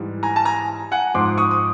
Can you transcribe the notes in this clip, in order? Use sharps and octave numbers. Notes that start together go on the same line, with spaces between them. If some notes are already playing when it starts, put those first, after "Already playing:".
Already playing: G#2 E3 G3
G#5 A#5
A5
G#5 A#5
F#5 G#5
G#2 F3 C6 D6
C#6 D#6
D#6